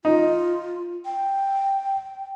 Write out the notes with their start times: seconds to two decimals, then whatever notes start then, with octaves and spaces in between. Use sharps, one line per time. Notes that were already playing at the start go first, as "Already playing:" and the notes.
0.05 D#4 F4
1.05 G5